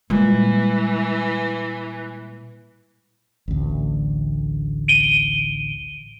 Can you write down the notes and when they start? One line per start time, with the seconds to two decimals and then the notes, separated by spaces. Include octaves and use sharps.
0.10 A#2 E3 G3 G#3
3.48 A1 D2
4.88 D7 D#7 G7